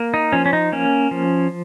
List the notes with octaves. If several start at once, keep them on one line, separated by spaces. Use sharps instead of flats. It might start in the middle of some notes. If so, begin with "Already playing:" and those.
Already playing: A#3
D#4
F3 C#4
C#4
D#4
A#3 C#4
F3